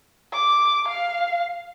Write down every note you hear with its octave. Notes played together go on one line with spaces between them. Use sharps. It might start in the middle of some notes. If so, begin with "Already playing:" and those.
D6
F5